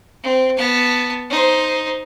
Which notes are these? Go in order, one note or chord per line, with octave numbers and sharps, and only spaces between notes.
C4
B3 A5
D#4 C5